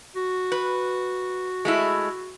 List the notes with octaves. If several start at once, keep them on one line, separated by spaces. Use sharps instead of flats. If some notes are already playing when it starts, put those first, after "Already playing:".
F#4
B4
G#3 A3 E4